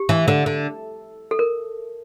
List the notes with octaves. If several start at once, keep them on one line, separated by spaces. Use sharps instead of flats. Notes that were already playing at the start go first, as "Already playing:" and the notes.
Already playing: G4
E3
D3
D3
A4
A#4